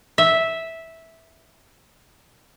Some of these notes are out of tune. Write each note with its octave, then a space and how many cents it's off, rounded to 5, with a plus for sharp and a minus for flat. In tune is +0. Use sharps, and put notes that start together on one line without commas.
E5 -10